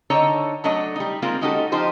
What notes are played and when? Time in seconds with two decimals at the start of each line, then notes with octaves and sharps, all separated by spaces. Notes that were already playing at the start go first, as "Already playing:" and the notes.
0.10 D3 D#4 A4 C#5 D#5 A5
0.64 F#3 A3 D4 A4 C#5 D#5
0.96 G3 D#4
1.22 G#3 A#3 C4 F4
1.41 G#3 C#4 D#4 F#4 G4 A4
1.72 F3 D#4 F4 G4 C5